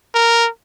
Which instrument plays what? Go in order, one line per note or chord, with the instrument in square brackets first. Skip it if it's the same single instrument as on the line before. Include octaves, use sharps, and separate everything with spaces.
[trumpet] A#4